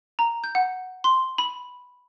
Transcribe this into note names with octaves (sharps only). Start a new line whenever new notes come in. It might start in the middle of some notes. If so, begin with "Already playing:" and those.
A#5
G6
F#5
C6
B5